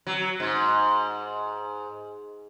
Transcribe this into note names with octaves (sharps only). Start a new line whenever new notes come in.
F#3
G#2